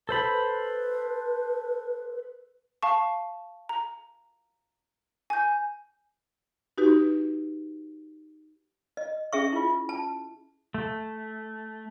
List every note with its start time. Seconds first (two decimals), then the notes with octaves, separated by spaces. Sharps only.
0.09 A4 B4 C5 B5
2.83 F5 A5 C#6
3.69 A#5
5.30 G#5 G6
6.78 D#4 F#4 G4 B4
8.97 D#5
9.33 C#4 G#4 E5 C#6
9.53 E4 F4
9.89 A5
10.74 A3